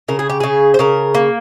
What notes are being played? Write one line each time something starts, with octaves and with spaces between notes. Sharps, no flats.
C#3 A#4
G#4
G4
C#3 G#4
C5
C#3 A#4
A#3